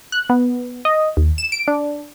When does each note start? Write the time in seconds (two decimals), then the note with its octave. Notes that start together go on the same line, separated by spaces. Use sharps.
0.12 F#6
0.30 B3
0.85 D#5
1.17 D#2
1.38 E7
1.52 D7
1.68 D4